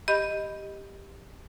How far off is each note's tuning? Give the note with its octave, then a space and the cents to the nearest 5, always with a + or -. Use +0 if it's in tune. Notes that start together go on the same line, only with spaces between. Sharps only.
G4 +10 D#5 +0 B5 +0